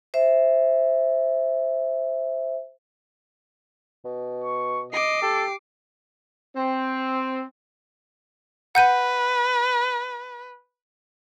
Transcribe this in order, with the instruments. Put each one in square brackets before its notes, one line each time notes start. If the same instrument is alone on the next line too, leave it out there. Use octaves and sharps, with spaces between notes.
[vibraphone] C5 E5
[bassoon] B2
[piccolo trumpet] C#6
[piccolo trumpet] D#5 [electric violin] D6 C7
[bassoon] G4 [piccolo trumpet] A4
[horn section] C4
[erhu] B4 [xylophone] F#5 G6 D#7